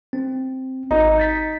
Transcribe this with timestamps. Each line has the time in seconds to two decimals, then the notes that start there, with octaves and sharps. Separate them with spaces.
0.13 C4
0.91 G#1 D#4
1.18 G6 A6 B6